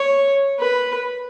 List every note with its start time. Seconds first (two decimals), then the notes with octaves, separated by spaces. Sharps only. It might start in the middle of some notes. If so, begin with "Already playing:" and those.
Already playing: C#5
0.60 B4